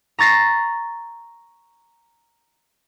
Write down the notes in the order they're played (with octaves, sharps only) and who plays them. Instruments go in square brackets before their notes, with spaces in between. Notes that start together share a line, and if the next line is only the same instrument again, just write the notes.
[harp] A#5 C#6 A6 A#6 C7